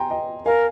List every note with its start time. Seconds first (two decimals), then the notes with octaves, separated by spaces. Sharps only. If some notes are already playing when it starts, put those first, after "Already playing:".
Already playing: G5 G#5 A#5 C6
0.10 D#5 G5
0.45 A#4 F5 G#5